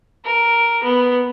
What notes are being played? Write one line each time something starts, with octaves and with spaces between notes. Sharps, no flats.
A#4
B3